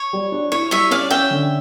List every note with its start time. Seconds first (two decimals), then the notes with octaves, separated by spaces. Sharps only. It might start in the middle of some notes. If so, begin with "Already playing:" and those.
Already playing: C#5
0.13 G3
0.32 D4
0.52 E4 C#5
0.71 G3 C#5 E5
0.91 C#4 D5 F5
1.10 C#4 E5 G5
1.31 D3